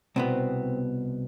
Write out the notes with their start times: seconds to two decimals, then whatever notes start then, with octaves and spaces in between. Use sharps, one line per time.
0.16 C2 B2 B3 C4